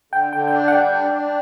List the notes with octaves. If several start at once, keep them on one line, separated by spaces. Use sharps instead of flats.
D3 G5
D3 G5
G5
D4
F#5
G3 G5
D4
D4